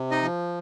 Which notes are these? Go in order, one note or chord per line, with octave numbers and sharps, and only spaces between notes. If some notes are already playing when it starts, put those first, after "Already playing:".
Already playing: C3
D#4 D#5
F3